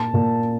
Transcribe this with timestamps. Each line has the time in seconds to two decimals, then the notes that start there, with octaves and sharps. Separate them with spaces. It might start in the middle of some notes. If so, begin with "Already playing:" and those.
Already playing: A#2 A5
0.14 A#2